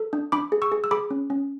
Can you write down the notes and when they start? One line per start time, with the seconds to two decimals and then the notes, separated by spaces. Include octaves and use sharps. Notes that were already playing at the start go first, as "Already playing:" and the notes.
Already playing: A4
0.13 D4
0.32 D4 B5 D6
0.52 G#4
0.62 C#6 E6
0.72 G#4
0.84 E6
0.91 G#4 B5 D6
1.11 C#4
1.30 C#4